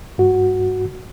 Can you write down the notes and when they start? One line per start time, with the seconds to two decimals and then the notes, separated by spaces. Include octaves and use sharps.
0.18 G2 F#4